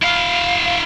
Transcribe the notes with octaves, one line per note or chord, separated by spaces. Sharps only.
E4 F5